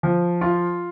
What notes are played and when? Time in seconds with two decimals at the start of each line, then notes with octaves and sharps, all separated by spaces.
0.03 F3
0.41 F4